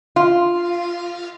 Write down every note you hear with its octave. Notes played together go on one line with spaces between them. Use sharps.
F4